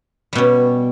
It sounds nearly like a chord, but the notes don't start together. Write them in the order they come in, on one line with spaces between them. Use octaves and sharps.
G3 B2 C#4